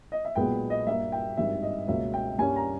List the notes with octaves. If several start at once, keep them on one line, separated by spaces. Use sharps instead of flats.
D#5
E5
B1 A#2 G#3 B3 G5
D#5
G2 G3 A#3 E5
G5
G#1 G2 D#3 E5
D#5
C#2 B2 A#3 C#4 E5
G5
G2 G3 A#3 C#4 G#5
A#5